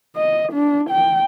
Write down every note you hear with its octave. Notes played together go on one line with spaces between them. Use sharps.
D#5
D4
G5